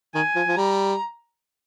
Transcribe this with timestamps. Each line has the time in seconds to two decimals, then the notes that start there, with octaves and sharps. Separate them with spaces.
0.15 D#3 G#5
0.36 F3
0.48 F3
0.56 G3 A#5